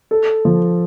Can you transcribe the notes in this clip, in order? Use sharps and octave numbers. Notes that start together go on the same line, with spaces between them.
A4
F3